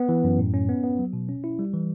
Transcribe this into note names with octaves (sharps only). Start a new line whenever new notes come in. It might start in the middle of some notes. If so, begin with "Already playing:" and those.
Already playing: B3
E3
F#2
A2
C#4
B3
B3
F#3
B2
C#4
E4
G3
E3